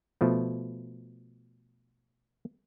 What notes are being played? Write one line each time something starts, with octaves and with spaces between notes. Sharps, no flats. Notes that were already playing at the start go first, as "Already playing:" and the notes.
B2 F3 A3